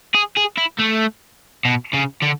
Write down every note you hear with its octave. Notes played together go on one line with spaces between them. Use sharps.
G#4
G#4
E4
A3
B2
C#3
D3